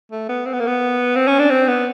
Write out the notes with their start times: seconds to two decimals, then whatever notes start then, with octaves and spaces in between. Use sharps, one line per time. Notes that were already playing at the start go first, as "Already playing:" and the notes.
0.12 A3
0.29 B3
0.46 C4
0.53 B3
0.60 A#3
0.67 B3
1.16 C4
1.28 C#4
1.39 D4
1.50 C4
1.68 B3